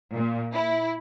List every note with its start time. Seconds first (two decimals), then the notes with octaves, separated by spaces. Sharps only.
0.13 A#2
0.53 E4